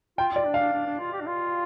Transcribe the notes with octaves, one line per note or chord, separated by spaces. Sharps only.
F4 G5
F4 D5
D4
F5
D4
D4
D4
F4
G4
D4
F4